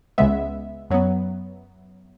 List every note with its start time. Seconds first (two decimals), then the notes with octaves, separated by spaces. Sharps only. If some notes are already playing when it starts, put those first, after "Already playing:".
0.18 C#2 C#3 G#3 B3 E5
0.90 F#2 F#3 B3